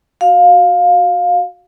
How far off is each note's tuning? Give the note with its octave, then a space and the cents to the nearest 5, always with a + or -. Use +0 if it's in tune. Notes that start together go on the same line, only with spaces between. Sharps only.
F#4 +0 F5 +15